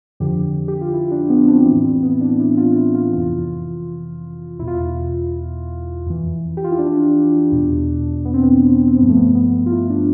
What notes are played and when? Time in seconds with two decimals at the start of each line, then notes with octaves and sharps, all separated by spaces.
0.20 F2 D3 F3 G4
0.68 G4
0.81 F4
0.93 E4
1.12 D4
1.30 B3
1.44 C4
1.48 D4
1.66 A2 E3 E4
1.85 C4
2.02 B3
2.21 D4
2.40 E4
2.57 F4
2.76 E4
2.95 F4
3.13 F2 C3 E3 F4
4.59 E2 E4
4.62 B2
4.67 F4
4.74 E4
6.06 F2 E3
6.57 G4
6.64 F4
6.71 E4
6.79 D4
7.52 E2 B2
8.25 B3
8.34 C4
8.43 B3
8.88 C4
8.98 G2 F3 B3
9.09 A3
9.17 B3
9.35 B3
9.53 B3
9.66 F4
9.72 E4
9.90 D4